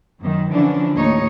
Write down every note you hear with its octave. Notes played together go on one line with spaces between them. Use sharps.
F#2 D#3
D3 E3 F3 C#4 D4
D#2 A2 D#4 C#5